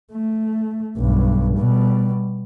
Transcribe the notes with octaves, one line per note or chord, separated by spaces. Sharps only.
A3
B1 G2
B2 G3